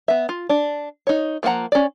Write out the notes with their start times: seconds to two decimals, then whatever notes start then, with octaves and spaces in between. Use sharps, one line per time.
0.08 B3 E5
0.29 F4
0.49 D4 D5
1.07 D#4 C#5
1.43 F3 A#3 D#4 F#5 A#5
1.72 C#4 D5